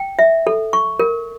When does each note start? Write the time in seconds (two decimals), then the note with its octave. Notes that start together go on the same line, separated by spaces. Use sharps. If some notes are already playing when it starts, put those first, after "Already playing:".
Already playing: G5
0.19 E5
0.47 A4
0.73 C#6
0.99 A#4